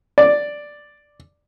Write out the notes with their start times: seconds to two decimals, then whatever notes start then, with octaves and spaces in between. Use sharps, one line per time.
0.18 D5